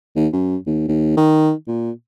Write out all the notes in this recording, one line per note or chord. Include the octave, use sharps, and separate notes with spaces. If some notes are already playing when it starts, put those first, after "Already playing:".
D#2
F#2
D#2
D#2
D#3
A#2